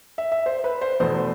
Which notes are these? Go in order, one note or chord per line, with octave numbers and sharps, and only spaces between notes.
E5
E5
C5
B4
C5
E2 B2 A3 C5